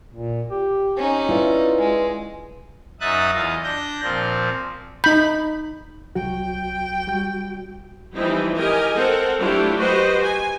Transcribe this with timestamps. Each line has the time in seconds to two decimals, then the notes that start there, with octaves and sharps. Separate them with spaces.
0.14 A#2
0.51 G4
0.98 C#4 D#4
1.29 E4 F4 B4 D5
1.78 G#3
3.01 F#2 D#4 E5 D#6 F#6 A6
3.33 E2 F4 D#5
3.64 D4 G6 A#6
4.03 A#2 F3 C4
5.04 D#4 B5 G6
6.15 C2 F#3 F#4 G5
7.07 G3 F#4 G6
8.15 E3 F3 G3 C4 D#4 E4
8.57 G4 A#4 D#5 G#5
8.96 C4 A4 A#4 F#5
9.39 F#3 A3 D4 E4 F4 G4
9.78 F#4 G4 B4 C5 D#5
10.22 G#5